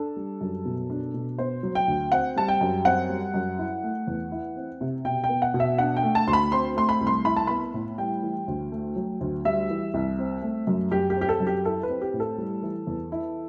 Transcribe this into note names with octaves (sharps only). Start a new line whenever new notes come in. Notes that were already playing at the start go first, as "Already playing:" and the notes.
Already playing: D4 A4
G3
F#2
B2
D4
B2
B3 C5
F#3
G5
D2
C4 F#5
G3 A5
G5
F#2
C4 F#5
G3
F#2
E4
A3
E2
E4
C4
C3
B2 G5
G5
B3
F#5
B2
E5
D4 F#5
G5
A3
A5
D2 C6
B5
C4 C6
A3 C6
B5
C2
C6
E4 B5
A5
B3 B5
A2
G3 G5
E3
D2
A3
F#3
D2
G3 E5
E3
C2
C4
A3
F#2
F#2 G4
G4
C4
G4
A4
F#2
G4
E4 A4
B4
C4
G4
A2
A4
G3
E3
E2
E4